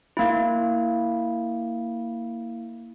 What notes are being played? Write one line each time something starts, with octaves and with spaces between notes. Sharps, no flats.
A#3 E4